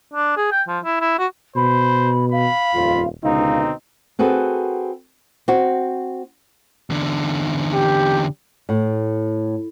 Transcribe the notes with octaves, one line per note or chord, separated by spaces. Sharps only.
D4
G#4
G5
F3
E4
E4
F#4
B2 C5 B5
F5 B5
D#1 F2 F4
C#2 B2 D3 C4 D#4 F5
C4 F#4 G#4 A4 B4
C4 F#4
E2 D3
G4
A2